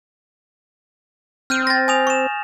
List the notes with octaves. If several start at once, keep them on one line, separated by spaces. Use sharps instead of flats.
C4 F6 G6 D#7
A6 A#6
G#5 D#6 F7
C#6 E7